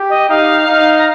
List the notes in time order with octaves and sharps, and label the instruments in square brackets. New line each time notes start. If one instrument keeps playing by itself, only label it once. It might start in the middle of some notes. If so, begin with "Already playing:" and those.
Already playing: [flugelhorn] G4
[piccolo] D#5
[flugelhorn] D#4 [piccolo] F5
[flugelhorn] D#4
[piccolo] A#5